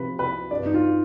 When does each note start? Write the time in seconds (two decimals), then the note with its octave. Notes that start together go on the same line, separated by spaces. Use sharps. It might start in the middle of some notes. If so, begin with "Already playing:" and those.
Already playing: C3 F3 B4
0.19 C2 B4
0.51 G2 D5
0.66 D#4
0.74 F4